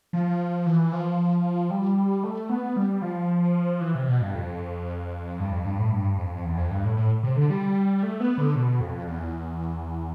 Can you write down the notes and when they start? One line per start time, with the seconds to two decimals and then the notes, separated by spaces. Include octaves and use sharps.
0.13 F3
0.66 E3
0.92 F3
1.71 G3
2.24 A3
2.49 B3
2.76 G3
3.02 F3
3.81 E3
3.95 C3
4.08 B2
4.21 G2
4.34 F2
5.40 G2
5.52 F2
5.65 G2
5.79 A2
5.92 G2
6.18 F2
6.45 E2
6.57 F2
6.71 G2
6.84 A2
6.97 A2
7.23 C3
7.36 D3
7.50 G3
8.03 A3
8.20 B3
8.38 D3
8.55 B2
8.81 F2
9.07 E2